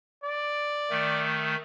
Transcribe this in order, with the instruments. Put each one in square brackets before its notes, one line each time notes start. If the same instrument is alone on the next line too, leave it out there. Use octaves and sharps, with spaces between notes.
[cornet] D5
[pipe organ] D#3 A3